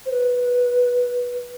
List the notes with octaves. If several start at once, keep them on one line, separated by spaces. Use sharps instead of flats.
C5
B4